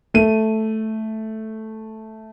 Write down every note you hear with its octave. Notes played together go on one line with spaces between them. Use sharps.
A3 D#7